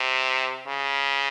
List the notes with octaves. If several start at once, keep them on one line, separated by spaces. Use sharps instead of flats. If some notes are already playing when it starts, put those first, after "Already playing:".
Already playing: C3
C#3